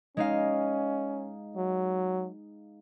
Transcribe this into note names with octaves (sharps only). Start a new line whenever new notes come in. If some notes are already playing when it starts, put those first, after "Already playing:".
G#3 C#4 D#4 F5
F#3